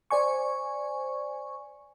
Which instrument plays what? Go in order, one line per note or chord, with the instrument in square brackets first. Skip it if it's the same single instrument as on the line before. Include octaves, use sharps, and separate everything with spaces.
[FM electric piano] C5 D5 G#5 C#6